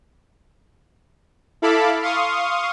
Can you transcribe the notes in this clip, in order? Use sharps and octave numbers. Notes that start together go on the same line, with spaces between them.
E4 A4 F5 A5 B5 D6
F5 C6 C#6 D#6